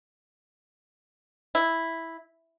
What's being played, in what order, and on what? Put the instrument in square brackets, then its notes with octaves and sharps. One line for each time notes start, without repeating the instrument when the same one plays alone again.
[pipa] E4